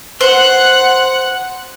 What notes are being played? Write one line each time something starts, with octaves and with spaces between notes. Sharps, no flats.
C5 F#5 F#6 C#7